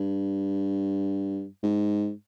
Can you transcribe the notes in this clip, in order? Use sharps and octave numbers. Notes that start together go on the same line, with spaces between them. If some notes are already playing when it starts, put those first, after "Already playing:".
Already playing: G2
G#2